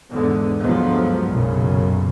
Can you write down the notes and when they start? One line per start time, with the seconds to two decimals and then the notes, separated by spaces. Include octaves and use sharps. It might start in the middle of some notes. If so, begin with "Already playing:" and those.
0.11 E2 G#2 D3 G#3 B3
0.61 D2 G2 F3 F#3 G#3 B3
1.28 B1 F#2 A#2 C#3